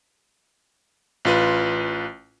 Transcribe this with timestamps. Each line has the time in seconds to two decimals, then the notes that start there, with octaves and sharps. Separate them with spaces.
1.25 A1 F4 B4